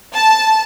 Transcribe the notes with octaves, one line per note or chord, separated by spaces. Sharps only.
A5